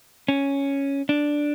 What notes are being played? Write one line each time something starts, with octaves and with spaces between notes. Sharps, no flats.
C#4
D4